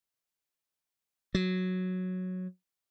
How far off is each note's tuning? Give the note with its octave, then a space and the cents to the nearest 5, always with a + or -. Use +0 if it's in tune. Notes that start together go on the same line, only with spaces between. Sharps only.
F#3 -5